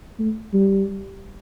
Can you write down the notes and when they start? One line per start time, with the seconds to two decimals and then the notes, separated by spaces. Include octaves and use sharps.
0.19 A3
0.54 G3